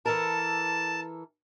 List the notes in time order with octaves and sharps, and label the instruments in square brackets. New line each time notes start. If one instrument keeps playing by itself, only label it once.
[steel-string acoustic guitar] E3 A4 A#4 [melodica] A5